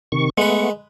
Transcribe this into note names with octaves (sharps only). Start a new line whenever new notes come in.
C3 D#3 C#6
G#3 A3 B3 B4 C#6